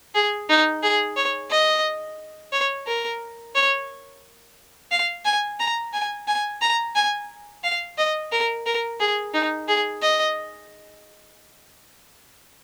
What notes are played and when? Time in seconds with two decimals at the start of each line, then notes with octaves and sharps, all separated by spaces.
0.15 G#4
0.49 D#4
0.83 G#4
1.17 C#5
1.51 D#5
2.53 C#5
2.87 A#4
3.55 C#5
4.91 F5
5.25 G#5
5.60 A#5
5.93 G#5
6.28 G#5
6.62 A#5
6.96 G#5
7.64 F5
7.98 D#5
8.32 A#4
8.66 A#4
9.00 G#4
9.34 D#4
9.68 G#4
10.02 D#5